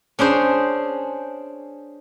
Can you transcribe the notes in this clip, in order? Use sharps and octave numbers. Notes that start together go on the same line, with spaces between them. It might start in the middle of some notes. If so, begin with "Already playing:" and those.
C#4 D4 G#4 C5